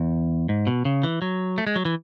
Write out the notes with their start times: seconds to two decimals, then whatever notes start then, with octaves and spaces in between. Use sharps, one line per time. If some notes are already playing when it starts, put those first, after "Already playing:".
Already playing: E2
0.49 G#2
0.67 B2
0.85 C#3
1.03 E3
1.22 F#3
1.58 A3
1.67 G#3
1.76 F#3
1.85 E3